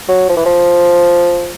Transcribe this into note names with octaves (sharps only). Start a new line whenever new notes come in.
F#3
F3
E3
F3